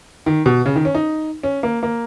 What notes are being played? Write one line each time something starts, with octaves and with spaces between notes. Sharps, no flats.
D#3
B2
C#3
D#3
C#4
D#4
C#4
A#3
A#3